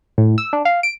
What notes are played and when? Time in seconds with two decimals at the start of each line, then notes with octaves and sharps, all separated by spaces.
0.18 A2
0.38 E6
0.53 D4
0.65 F5
0.83 D7